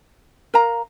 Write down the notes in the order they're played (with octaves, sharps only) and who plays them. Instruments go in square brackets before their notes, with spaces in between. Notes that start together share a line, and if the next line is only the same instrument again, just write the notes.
[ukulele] A#4 F5 A#5